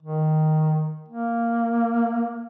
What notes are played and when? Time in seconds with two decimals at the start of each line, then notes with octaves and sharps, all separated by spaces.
0.03 D#3
1.09 A#3